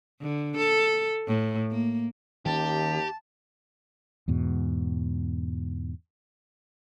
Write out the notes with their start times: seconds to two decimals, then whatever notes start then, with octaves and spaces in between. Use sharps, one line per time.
0.21 D3
0.57 A4
1.27 A2
1.71 A#3
2.46 D#2 D#3 C#4 G4 A5
4.28 E2 G#2 B2